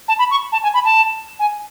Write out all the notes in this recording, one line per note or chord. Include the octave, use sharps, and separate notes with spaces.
A5
B5
C#6
A5
G#5
B5
A5
G#5